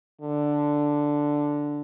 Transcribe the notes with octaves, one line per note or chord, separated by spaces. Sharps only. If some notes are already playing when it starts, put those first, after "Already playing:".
D3